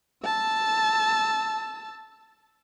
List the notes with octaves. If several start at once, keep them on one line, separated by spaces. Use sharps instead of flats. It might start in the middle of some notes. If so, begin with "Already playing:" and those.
A5 E6